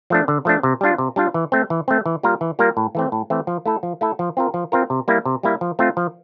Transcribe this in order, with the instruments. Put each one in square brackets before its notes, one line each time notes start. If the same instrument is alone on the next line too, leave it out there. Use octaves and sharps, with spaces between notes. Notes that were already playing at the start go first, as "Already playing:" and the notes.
[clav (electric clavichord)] F3 A3 D4
D3
F3 A3 D4
C3
G3 D4 F4
C3
G3 D4 F4
E3
A3 C4
E3
A3 C4
E3
G3 A#3 F4 A#4
E3
G3 A#3 F4 A#4
A2
E3 A3 C4
A2
E3 A3 C4
F3
A3 E4 A4
F3
A3 E4 A4
F3
C4 F4 A#4
F3
C4 F4 A#4
C3
G3 A#3 E4
C3
G3 A#3 E4
F3
A3 C4 F4
F3